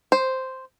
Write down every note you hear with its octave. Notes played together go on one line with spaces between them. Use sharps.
C5